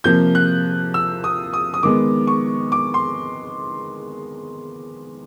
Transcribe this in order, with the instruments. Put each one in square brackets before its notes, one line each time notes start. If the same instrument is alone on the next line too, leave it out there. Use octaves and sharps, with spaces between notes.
[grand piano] C3 F3 A#3 G6
F#6
E6
D#6
D#6
D#6
D#3 G#3 B3 D6
C#6
D6
C6